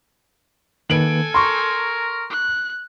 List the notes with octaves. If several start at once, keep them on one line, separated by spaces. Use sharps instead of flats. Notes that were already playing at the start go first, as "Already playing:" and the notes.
D#3 A#3 A4 B4 G#5 D7 F#7
A#4 A#5 C6 C#6
F#6